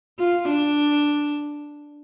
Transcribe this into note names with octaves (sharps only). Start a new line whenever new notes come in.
F4
D4